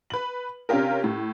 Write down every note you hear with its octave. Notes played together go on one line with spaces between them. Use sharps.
B4 F#7
C3 C#4 D4 F4 G4 A#4
A2